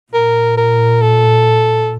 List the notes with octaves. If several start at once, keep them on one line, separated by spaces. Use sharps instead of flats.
A#2 A#4
A#4
A4